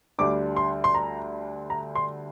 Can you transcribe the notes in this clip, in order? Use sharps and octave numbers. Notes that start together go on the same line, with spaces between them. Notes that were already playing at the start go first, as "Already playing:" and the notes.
D2 D3 G3 D4 D6
C6
C6
A#5
A#5
C6